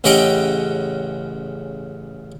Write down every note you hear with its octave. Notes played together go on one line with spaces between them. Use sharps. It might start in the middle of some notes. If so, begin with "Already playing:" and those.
A1 C#3 G4 D#5 F#5 G5